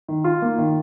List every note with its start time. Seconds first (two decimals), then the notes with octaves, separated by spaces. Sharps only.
0.08 D#3
0.24 F4
0.42 A#3
0.58 D#3